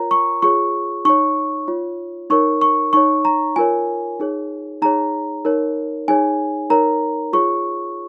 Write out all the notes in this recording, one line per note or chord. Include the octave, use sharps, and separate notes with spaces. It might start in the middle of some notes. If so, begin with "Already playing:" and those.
Already playing: F4 A#4 C#5 A#5
C#6
F4 G#4 C#5 C#6
D#4 C#5 C#6
F4 C#5
D#4 A#4 C#5 C#6
C#6
D#4 C#5 C#6
A#5
F4 A#4 C#5 G#5
D#4 G#4 C#5
D#4 G#4 C#5 A#5
D#4 A#4 C#5
D#4 G#4 C#5 G#5
D#4 A#4 C#5 A#5
F4 G#4 C#5 C#6